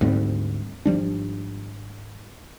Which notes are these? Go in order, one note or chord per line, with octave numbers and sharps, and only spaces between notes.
D2 G#2 G3 C4
G#1 F3 G3 D4